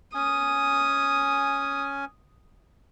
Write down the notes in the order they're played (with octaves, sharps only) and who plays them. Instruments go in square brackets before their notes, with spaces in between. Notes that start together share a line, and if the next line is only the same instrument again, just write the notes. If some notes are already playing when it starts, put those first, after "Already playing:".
[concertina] C#4 G#5 [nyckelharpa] D#6